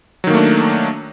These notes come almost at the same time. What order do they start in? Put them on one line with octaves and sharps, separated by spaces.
F#3 D#3 A#3 A3 D4